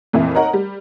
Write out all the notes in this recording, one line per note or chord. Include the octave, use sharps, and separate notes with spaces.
F2 A#2 E3 E4
D#4 A#4 C#5 F#5 A#5
G3